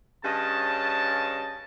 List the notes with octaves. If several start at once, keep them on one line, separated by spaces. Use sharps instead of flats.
G2 C#3 C#4 D#5 A5